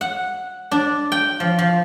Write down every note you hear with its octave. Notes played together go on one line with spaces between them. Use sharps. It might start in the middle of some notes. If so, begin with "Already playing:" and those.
F#5
D4
G5
F3
F3